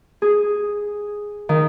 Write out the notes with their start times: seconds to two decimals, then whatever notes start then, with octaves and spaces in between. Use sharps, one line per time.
0.22 G#4
1.49 D#3